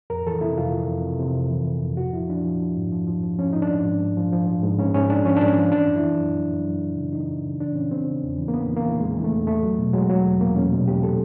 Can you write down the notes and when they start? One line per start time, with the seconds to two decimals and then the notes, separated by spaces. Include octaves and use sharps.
0.10 F2 A#4
0.27 E3 A4
0.41 C3 E4
0.58 F2 F4
0.72 F2
0.89 F2
1.04 C3
1.20 C3
1.36 F2
1.51 E3
1.67 E3
1.83 F2
1.97 F3 F#4
2.13 F3 E4
2.30 F3 D4
2.45 F3
2.60 F3
2.76 G#2
2.92 F3
3.07 F3
3.23 F3
3.38 F3 C#4
3.53 G#2 D#4
3.62 D4
3.69 F3
3.85 G#2
4.00 G#2
4.17 F3
4.32 F3
4.47 F3
4.63 G#2
4.78 G#2 C#4
4.94 G#2 C#4
5.09 G#2 D4
5.25 F3 C#4
5.36 G#2 D4
5.46 C#4
5.57 F3
5.72 E3 D4
5.88 F#2
5.96 E4
6.03 E3
6.20 F#2
6.35 F#2
6.51 F#2
6.66 F#2
6.82 F#2
6.97 C#3
7.12 E3 D#4
7.29 F#2
7.44 C#3
7.60 E3 D4
7.75 E3 C#4
7.90 E3 C4
8.07 C#3
8.23 E2
8.38 E3
8.48 A#3
8.54 E2 B3
8.69 E3
8.76 A#3
8.85 E3
9.00 E2 G#3
9.16 E3
9.24 A3
9.32 E2
9.47 E2 A3
9.63 F#3
9.79 B2
9.94 F#3 G#3
10.09 F#3
10.25 E2
10.40 E2 A#3
10.56 E2 C#4
10.72 B2
10.88 E2 G4
11.03 A4